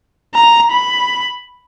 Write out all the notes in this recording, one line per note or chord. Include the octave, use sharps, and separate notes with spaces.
A#5
B5